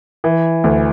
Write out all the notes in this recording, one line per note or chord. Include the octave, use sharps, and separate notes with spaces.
E3
D2